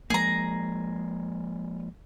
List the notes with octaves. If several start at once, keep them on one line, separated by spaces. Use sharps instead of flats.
F3 G#3 A#3 G#4 A#5